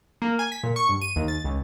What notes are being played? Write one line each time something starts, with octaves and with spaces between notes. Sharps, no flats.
A#3
G#5
B6
A#2
C#6
G2
D#7
D#2
A6
C#2